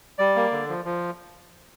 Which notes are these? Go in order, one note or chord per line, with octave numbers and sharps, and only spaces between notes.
G3 D5
A#3
D3
F3
F3